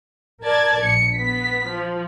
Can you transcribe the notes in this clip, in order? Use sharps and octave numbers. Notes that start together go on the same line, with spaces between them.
A#4 D5 A5 G#6 A6
A#1 C#7
B3 B6
F3